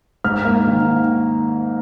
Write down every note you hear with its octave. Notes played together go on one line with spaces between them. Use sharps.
G#2 F6
A#3
D#3